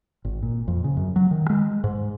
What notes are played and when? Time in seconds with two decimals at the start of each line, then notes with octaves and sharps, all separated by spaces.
0.25 G#1
0.43 A#2
0.68 F2
0.84 C#3
0.97 F#2
1.16 F#3
1.31 D#3
1.50 G#3
1.84 G#2